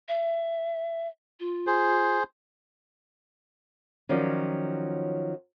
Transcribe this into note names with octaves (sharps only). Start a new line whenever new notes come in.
E5
F4
G#4 C5
D#3 F3 F#3 C#4 D5